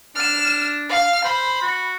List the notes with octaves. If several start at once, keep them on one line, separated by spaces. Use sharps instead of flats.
D4 F6 E7
F5 F6
C5 B5
F#4